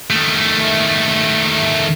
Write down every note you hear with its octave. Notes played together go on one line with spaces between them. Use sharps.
D#3 A3